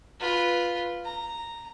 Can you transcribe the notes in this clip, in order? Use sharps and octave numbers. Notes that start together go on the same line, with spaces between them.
F4 B4
A#5